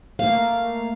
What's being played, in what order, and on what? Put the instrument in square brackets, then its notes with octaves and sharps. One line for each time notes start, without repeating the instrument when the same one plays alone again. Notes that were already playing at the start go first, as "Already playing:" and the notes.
[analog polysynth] A3 A#3 [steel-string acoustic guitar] F5